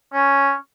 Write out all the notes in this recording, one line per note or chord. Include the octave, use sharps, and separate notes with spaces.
C#4